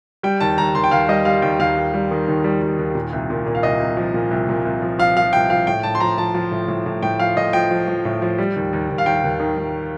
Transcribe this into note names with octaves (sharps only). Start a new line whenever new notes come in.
G3 G5
D#2 A5
D#2 A#5
D#2 C6
G5
D#2 F5
G3 D#5
G3 F5
D#2 G5
D#2 F5
D#2
G3
D#3
D#2
G3
G3
D#2
A#2
C2
A#2
A#2
F5
C2 D#5
C2
F3
A#2
C2
A#2
C2
F3
F3 F5
F3 F5
C2 G5
F3 F5
A2 G5
A2 A5
C6
F3 A#5
F3 A5
F3
A2
A2
A2
A2 G5
F3 F5
A2 D#5
F3 G5
F3
F3
A2
F3
G3
D#2
D#2
D#2
F5
D#2 G5
D#2
D#3
D#3